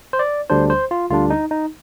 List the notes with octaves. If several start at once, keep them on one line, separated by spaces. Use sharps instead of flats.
C5
D5
D2 D3 G3 D4 C5
C5
F4
D2 D3 G3 D4 F4
D#4
D#4